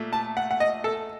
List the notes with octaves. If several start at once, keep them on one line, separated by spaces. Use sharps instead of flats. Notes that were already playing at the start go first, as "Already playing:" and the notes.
Already playing: A#2 A3
A5
F#5
F#5
D#5
A4